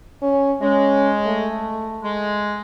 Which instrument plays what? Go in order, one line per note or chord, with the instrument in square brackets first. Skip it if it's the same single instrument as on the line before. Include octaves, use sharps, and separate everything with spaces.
[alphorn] C#4
[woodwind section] G#3 [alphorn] C#4
[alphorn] A3
[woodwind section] G#3